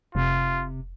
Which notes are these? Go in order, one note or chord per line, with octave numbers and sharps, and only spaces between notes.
F1 C3 F4